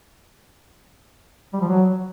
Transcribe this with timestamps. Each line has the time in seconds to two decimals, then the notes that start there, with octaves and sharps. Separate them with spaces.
1.53 G3
1.61 F3
1.68 F#3